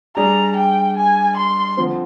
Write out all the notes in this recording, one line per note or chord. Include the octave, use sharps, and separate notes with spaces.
G3 D4 G#4 D5 A#5
G5
G#5
C6
F2 D3 F3 C4